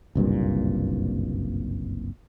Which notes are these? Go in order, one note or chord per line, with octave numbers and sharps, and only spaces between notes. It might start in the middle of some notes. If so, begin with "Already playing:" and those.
F#1 C2 G2 A#2